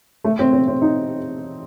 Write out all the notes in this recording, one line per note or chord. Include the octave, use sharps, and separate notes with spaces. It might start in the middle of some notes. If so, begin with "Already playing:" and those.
A3
C4
C4
C4
D#4